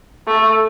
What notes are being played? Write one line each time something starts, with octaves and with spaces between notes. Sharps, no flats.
A3